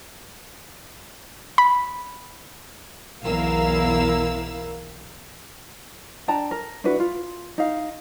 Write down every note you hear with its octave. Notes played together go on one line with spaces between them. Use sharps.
B5
B1 E2 E4 A#4 F5 E6
D4 G5 A5 A#5
A#4
D4 E4 F#4 B4
F4
D#4 F5